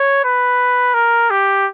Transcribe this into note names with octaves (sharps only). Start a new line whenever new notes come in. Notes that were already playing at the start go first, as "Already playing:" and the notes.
Already playing: C#5
B4
A#4
G4